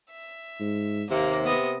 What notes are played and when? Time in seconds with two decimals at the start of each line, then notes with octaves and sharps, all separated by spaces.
0.11 E5
0.60 G#2
1.10 D#2 C3 A#3
1.44 B3 D#5